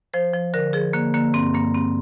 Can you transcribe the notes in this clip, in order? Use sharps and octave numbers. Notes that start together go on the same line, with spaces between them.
F3 C5
F3
D3 A#4
F3 G#4
D3 A#3
D3 A#3
G2 C4
G2 A#3
G2 C4